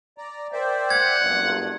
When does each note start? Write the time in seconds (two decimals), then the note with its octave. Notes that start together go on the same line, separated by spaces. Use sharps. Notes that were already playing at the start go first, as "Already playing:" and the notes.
0.18 D5 A#5
0.52 A#4 C5 D5 E5 G5
0.90 F#5 G#6
1.21 F#1 B1 G2 C6